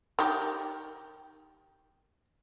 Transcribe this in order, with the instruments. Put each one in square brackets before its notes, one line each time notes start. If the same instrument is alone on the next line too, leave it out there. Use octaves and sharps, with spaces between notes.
[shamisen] D#3 G4